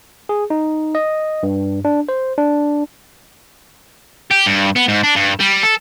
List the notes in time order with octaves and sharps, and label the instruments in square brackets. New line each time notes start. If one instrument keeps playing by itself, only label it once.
[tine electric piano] G#4
D#4
D#5
G2
D4
C5
D4
[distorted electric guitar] G4
G2
B3
G#2
D4
G2
G3
A4